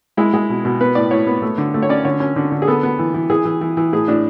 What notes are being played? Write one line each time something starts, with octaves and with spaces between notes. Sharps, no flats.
G#3 E4
G#3
B2
B2
B3 B4
A2 D5
A2 C#5
B3
A3
D3
A3
C#5
C#4 D5
D3 C#5
C#4
D3
D3
G#4
B3 A4
B3
E3
E3
E3 G#4
E3
E3
E3
A2 G#4
A2 D4